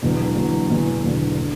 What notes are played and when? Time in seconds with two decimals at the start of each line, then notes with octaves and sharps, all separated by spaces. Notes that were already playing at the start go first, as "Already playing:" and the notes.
0.02 E1 E2 D3 F#3
0.36 E1 E2 D3 F#3
0.69 E1 E2 D3 F#3
1.04 E1 E2 D3 F#3
1.38 D3